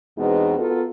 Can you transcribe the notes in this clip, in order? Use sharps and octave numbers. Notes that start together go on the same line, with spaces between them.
E2 B2 G#3 B3 C4 D#4
B3 F4 F#4 A4 A#4